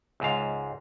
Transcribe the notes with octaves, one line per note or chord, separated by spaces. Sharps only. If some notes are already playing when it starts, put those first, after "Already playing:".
C#2 G#2 F5